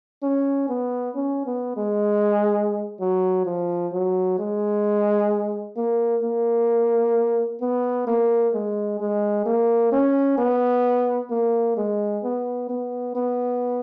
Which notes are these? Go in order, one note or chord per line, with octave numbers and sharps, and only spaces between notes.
C#4
B3
C#4
B3
G#3
F#3
F3
F#3
G#3
A#3
A#3
B3
A#3
G#3
G#3
A#3
C#4
B3
A#3
G#3
B3
B3
B3